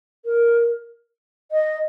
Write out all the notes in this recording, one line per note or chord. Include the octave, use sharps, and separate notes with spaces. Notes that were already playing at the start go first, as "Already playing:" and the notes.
A#4
D#5